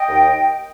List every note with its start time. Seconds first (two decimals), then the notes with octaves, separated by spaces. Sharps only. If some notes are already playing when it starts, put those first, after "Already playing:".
Already playing: D#5 G5
0.09 D#2